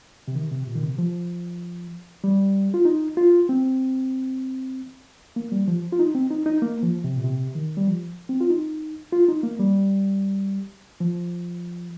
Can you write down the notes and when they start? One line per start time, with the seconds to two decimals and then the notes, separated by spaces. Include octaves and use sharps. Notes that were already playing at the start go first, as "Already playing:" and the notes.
0.28 C3
0.36 D#3
0.51 C3
0.67 A#2
0.76 D#3
0.82 C3
0.98 F3
2.24 G3
2.74 F4
2.85 D#4
3.17 F4
3.49 C4
5.36 A#3
5.52 G3
5.68 F3
5.92 F4
5.99 D#4
6.15 C4
6.31 D#4
6.46 D#4
6.62 A#3
6.83 F3
7.04 C3
7.16 A#2
7.24 C3
7.55 D#3
7.77 G3
7.88 F3
8.29 C4
8.41 F4
8.50 D#4
9.13 F4
9.28 D#4
9.43 A#3
9.59 G3
11.00 F3